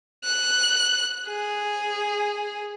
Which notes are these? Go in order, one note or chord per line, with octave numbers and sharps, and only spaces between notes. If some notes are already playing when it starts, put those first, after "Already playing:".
F#6
G#4